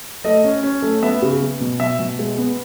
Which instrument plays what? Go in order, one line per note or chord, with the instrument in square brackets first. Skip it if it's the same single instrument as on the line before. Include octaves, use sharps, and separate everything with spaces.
[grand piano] A3 D#5
C#4
C#4
A3
B3 E5
C#3
B3
B2
B2 E5
B2
G#3
B3